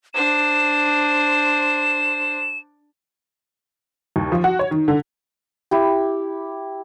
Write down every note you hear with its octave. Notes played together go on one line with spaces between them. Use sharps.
D4 C5 E7
D#2
F3
F#4
C#5
D#3
D3
E4 G4